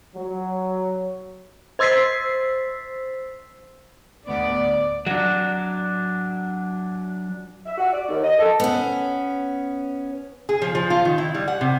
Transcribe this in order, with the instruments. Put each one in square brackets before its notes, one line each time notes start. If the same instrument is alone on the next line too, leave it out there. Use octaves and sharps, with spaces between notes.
[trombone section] F#3
[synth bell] C5 C6 E6 A6 B6 C7
[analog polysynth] D2 B3 [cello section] D5
[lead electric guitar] F#3 D4
[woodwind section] E5
F#4
D5
D#2
D#5
A4
[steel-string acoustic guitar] B3 C#4
[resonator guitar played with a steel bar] G#4
F3
F3
F4
D#3
E4
G3
F#5
C3